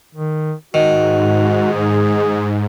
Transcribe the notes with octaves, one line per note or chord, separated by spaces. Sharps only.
D#3
G#2 D#3 F#4
G#4